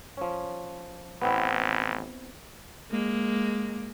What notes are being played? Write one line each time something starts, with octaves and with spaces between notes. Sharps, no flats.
F3 C#4
A1 B3 C4 E4
G#3 A#3